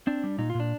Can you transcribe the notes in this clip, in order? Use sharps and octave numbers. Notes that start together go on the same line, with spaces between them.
C4 D4
G3
A#2 D#4
F4
A#2
D4